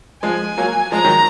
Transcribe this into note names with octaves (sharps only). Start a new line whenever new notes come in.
F3 G#3 G#5
F#3 A#3
F3 G#3 A#5
D#3 F#3